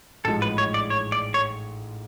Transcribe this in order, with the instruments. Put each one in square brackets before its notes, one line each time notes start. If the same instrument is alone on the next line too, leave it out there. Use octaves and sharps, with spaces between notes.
[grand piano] A1 G#2 F3 G#3 [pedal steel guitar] A4
[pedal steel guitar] B4
C#5
D5
C#5
D5
C#5